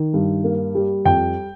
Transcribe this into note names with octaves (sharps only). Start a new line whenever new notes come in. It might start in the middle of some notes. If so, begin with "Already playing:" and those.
Already playing: D#3
G2
A#3
G3
F2 G5